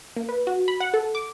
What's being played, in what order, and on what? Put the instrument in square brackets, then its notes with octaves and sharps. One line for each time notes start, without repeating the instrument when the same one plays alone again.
[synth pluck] A#3
B4
F#4
B5
F#5
A4
D6